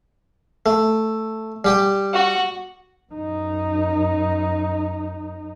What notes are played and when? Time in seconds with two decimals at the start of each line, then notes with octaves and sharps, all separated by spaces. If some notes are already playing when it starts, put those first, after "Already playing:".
0.66 A3
1.65 G3 G4 G5
2.13 F#4
3.13 F#2 D#4